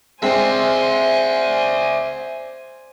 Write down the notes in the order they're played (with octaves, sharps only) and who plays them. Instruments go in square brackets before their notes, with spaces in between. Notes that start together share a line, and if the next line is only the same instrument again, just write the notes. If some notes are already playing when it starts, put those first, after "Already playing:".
[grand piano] G#3 C4 [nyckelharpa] C5 G#5 [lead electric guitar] D5 E5